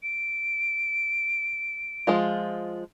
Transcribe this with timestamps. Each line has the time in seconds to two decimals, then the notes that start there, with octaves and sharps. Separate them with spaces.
0.03 D7
2.07 F3 G#3 F4